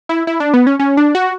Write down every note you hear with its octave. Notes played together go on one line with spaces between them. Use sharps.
E4
E4
D4
B3
C#4
C#4
D4
F#4